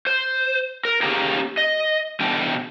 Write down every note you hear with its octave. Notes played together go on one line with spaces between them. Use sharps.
C5
A#4
A#3 C#4 G4 G#4 G5 A#5
D#5
B2 D3 E3 D4 G5